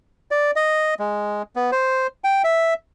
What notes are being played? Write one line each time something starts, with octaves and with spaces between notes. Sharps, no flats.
D5
D#5
G#3
B3
C5
G5
E5